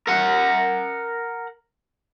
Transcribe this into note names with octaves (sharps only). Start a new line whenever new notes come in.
A#4 F#5